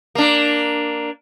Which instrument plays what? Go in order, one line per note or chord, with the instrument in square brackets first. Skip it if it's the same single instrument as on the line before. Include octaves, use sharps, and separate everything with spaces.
[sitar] A#3 D4